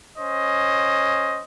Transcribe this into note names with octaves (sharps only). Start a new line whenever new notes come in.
C#4 C5 D#5